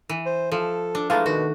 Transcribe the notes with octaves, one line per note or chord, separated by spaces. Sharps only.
E3
C5
F3 A4
D4
E3 G#3 A3 F5 A5 A#5
B2 D#3 F#4